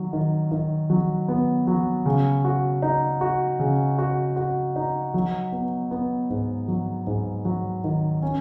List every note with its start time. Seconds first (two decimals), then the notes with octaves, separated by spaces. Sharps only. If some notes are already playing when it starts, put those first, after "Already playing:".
Already playing: D#3 F#3
0.13 D#3
0.51 D#3
0.90 F#3
1.28 B3
1.67 F#3
2.06 C#3
2.45 F#4
2.82 D#4
3.21 F#4
3.60 C#3
3.98 F#4
4.36 F#4
4.76 D#4
5.14 F#3
5.52 B3
5.91 B3
6.30 G#2
6.68 F#3
7.07 G#2
7.45 F#3
7.84 D#3
8.22 C#4